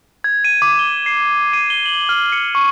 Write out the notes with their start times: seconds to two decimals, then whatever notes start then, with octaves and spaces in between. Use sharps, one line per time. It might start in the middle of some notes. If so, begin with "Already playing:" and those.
0.24 G#6
0.45 D#7
0.62 D6
0.79 G7
1.06 C7
1.53 D#7
1.70 G7
1.86 F#7
2.09 F6
2.32 C#7
2.55 C#6